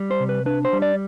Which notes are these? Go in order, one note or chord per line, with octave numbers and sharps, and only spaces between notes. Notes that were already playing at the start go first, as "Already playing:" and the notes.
Already playing: G3
C5
C3
B4
D4 B4
C5
G3
D5